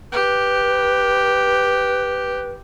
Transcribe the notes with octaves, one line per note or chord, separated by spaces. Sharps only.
G4 B4